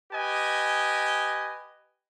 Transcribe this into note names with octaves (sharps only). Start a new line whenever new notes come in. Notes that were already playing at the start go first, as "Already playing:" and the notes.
G4 B4 D#5 G#5